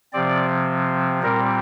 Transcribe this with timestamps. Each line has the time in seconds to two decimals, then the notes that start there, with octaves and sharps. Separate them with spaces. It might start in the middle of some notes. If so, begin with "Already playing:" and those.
0.13 C3 F3 C4 D5
1.23 A#2 G3 C4 A#4